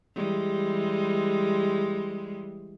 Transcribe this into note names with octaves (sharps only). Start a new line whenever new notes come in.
E3 G3 G#3